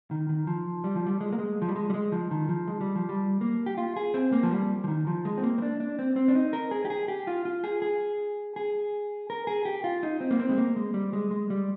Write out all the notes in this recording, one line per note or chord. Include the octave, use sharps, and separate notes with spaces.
D#3
D#3
F3
G3
F3
G3
G#3
A#3
G#3
F3
G3
G#3
G3
G#3
F3
D#3
F3
G#3
G3
F3
G3
A#3
G4
F4
G#4
C4
A#3
F3
G3
F3
D#3
F3
G#3
C4
A#3
C4
D4
D4
C4
C4
D4
D#4
A#4
G#4
G4
G#4
G4
F4
F4
G#4
G#4
G#4
A#4
G#4
G4
F4
D#4
C4
A#3
C4
G#3
A#3
G#3
G3
G#3
G#3
G3